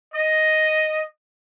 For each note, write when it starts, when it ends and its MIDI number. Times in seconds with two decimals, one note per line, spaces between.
0.14 1.04 75